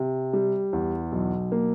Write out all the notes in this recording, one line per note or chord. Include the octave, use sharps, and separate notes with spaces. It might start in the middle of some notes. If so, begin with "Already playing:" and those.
Already playing: C3
G3
E2
B1
A#3